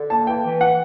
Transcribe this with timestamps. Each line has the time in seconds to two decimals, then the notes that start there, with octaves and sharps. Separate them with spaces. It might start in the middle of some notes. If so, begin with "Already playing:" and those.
Already playing: D3
0.10 A#3 A5
0.27 E3 G5
0.44 E3
0.61 F#5